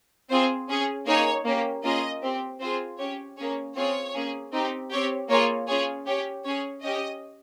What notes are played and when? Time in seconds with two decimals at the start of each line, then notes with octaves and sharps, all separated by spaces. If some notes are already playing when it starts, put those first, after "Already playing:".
0.29 C4 F4 G#4 C5
0.68 C#4 G#4
1.06 A#3 D#4 G#4 C#5
1.45 A#3 C#4 G4
1.83 A#3 C#4 F4 G#4 D#5
2.22 C4 G4
2.60 C4 F4 G#4 C5
2.98 C#4 G4 C#5
3.37 A#3 C#4 G#4 C#5
3.76 C4 F4 G#4 C#5
4.14 A#3 C#4 G#4
4.53 C4 D#4 G4
4.91 C4 G4 C#5
5.29 A#3 F4 G#4 C#5
5.67 C#4 F4 G#4 C#5
6.06 C#4 G4 C#5
6.44 C#4 G#4 C#5
6.83 C#4 G4 D#5